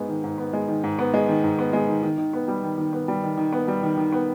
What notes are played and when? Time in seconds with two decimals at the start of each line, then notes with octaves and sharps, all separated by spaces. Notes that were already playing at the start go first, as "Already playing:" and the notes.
Already playing: G#2 G#3 B3
0.09 D#3
0.24 G#2
0.38 B3
0.53 G#3
0.68 D#3
0.84 G#2
0.99 B3
1.14 G#3
1.28 D#3
1.44 G#2
1.59 B3
1.73 G#3
1.88 D#3
2.03 D#3
2.18 D#3
2.33 B3
2.48 G3
2.63 D#3
2.78 D#3
2.93 B3
3.08 G3
3.23 D#3
3.38 D#3
3.53 B3
3.68 G3
3.83 D#3
3.98 D#3
4.13 B3